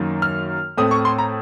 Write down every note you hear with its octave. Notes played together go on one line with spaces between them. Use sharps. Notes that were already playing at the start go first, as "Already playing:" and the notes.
Already playing: F#2 D#3 A#3
F6
A2 A3 C4 D#6
C#6
C6
A#5